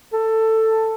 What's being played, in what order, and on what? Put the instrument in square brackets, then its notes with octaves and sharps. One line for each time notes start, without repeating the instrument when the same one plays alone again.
[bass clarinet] A4